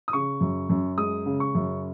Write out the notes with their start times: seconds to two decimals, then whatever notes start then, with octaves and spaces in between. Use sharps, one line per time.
0.08 D#6
0.13 C#3 C#6
0.41 F#2
0.69 F#2
0.98 G#3 D#6
1.26 C#3
1.40 C#6
1.55 F#2